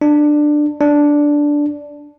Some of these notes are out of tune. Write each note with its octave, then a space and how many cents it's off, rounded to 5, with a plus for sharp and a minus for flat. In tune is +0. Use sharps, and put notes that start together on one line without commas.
D4 +15
D4 -5